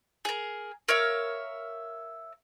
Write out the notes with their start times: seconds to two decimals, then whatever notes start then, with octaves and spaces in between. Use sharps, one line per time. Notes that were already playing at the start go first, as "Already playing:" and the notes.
0.25 G#4 A#4
0.88 A#4 C#5 E5 F5